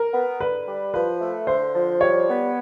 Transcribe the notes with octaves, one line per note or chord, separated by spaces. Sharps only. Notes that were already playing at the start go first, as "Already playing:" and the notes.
Already playing: A#4
B3
D3 B4
G3
F3 B4
A3
D3 C5
F3
G3 C#5
B3